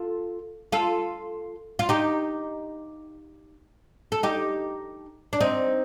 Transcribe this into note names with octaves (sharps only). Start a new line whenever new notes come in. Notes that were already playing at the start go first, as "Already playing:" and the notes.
Already playing: F4 A4
F4 A4
F4
D#4 G4
A4
D#4 G4
D4
C4 D#4